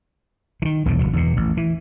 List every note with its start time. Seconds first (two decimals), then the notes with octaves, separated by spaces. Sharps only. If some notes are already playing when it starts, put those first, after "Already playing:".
0.62 D#3 E3
0.86 B1 E2 A2 C#3
0.99 G1 D#2 F#3
1.13 E2 B2
1.37 A1
1.57 E3